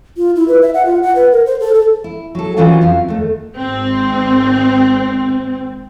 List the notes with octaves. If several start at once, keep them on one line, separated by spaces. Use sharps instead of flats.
F4
E4
B4
E5
F#5
F4
F#5
B4
A#4
C5
A4
A4
E4
F#3 A4
D#3 E3 F#3 C#4 D4 F4
F2 E4 F5
D#2 A3
G#1 C4